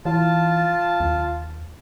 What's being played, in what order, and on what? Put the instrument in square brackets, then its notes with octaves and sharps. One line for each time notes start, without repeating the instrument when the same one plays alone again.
[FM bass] E3 [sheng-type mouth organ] F4 A5
[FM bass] D#2